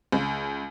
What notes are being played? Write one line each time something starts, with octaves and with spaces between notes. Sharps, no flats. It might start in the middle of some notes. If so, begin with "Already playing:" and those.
C#2